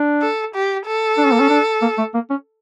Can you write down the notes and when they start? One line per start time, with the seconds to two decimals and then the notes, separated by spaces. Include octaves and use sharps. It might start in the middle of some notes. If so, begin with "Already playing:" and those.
Already playing: D4
0.21 A4
0.54 G4
0.86 A4
1.18 D4
1.26 C#4
1.33 A#3
1.40 C#4
1.50 D4
1.82 A#3
1.98 A3
2.14 A#3
2.30 C#4